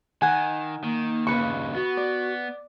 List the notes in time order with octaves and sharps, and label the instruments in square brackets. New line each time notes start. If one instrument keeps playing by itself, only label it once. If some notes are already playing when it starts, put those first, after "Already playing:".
[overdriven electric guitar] D#3 [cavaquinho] F#5 G#5
[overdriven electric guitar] D#3 [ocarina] A#3
[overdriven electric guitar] D#2 C#3 [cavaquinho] B4 C#6
[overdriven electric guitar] B3 [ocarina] F#4
[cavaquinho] D5